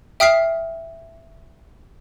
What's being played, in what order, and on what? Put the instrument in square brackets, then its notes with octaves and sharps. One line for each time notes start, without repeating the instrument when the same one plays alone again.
[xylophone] E5 G5 D#6 F6 B6 C7